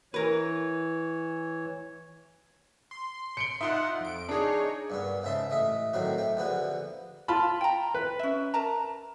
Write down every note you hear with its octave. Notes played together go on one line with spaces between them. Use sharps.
E3 A#4 B4 C#5
C6
C#7 D7 G7
D#4 F4 E5 F#5 C6
F2 D7
D4 D#4 G#4 C#5
G2 A#2 B3
G#2 C#3 E5 A5 C6
A1 A3 D#5 E5
A2 D#3 F#3 C4 F#4
A3 G5
A#1 D3 F3 B3 F#4
F4 A5 B5
G5 A#5
B4
C#4 E5
A#4 A5 A#5